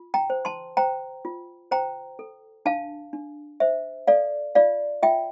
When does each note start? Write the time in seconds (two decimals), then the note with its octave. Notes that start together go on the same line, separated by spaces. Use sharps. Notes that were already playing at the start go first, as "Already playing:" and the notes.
Already playing: F4
0.14 G5 A#5
0.30 C5
0.45 A5 C6
0.77 C5 G5 A#5
1.25 F4
1.71 C5 G5 A#5
2.19 A4
2.65 D4 F5 A5
3.13 D4
3.60 C5 E5
4.07 A4 D5 F5
4.55 F4 D5 F5
5.03 F4 E5 G5